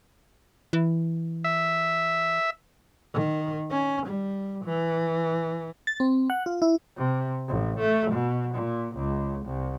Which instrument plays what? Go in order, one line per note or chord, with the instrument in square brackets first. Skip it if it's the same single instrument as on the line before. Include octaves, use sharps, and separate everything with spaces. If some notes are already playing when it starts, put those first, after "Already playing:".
[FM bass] E3
[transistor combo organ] E5
[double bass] D#3
C#4
G3
E3
[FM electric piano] A6
C4
F#5
F4
E4
[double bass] C3
A1
A3
B2
A#2
C#2
C2